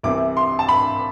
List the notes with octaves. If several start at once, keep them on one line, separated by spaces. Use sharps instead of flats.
C2 C3 E3 D6
C6
A5
B5